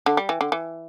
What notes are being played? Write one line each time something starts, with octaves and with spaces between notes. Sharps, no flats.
D3
G3
E3
D3
E3